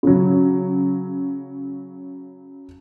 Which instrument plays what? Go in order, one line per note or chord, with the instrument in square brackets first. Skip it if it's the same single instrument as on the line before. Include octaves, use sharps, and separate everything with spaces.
[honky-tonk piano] C#3 F#3